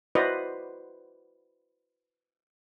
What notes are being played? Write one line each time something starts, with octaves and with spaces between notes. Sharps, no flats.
E4 F#4 B4 C5 D5 D#5